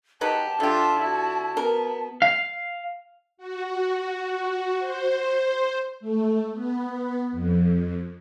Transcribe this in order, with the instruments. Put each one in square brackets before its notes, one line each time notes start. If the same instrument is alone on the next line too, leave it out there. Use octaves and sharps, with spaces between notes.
[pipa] F#3 D#4 B4 [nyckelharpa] G4 [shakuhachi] A5
[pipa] D3 G4 [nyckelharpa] F4 E5
[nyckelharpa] E4 F#4
[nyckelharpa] B3 [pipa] A#4
[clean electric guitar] F5
[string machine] F#4
C5
A3
B3
F2